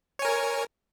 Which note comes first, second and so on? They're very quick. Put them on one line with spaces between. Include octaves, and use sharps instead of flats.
C#5 G#5 A#4